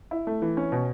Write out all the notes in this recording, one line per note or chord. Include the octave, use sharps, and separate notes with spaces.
E4
A3
E3
C#4
B2